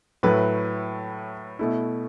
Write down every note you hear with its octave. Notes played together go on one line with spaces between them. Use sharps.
A2 F#3 A3 E4 B4
B2 A3 E4